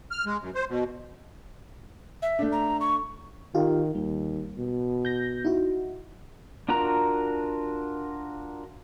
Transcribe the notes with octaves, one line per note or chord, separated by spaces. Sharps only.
F6
G#3
F#2
C5
B2
E5
A3 D4
A#5
C#6
D#3 F4 G4 F5
D#2 G3
B2
G6 A#6
D#4 E4 F#4
D4 F4 F#4 A#4 A#5